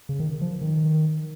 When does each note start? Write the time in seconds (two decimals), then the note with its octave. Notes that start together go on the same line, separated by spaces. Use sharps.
0.09 C#3
0.20 D#3
0.41 F3
0.61 D#3